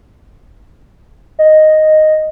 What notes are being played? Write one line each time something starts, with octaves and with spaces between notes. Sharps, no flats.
D#5